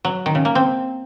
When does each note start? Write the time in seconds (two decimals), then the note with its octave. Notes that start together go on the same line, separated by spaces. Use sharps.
0.05 F#3
0.26 D#3
0.35 C#3
0.45 A#3
0.55 C4